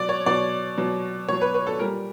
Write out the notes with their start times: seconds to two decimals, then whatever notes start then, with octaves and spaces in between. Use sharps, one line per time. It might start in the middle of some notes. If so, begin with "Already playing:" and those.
Already playing: B2 F#3 D5
0.09 C#5
0.26 B2 F#3 D5
0.77 B2 F#3
1.28 B2 C#5
1.32 F#3
1.41 B4
1.54 B4
1.67 A4
1.79 A#2 G3 A#4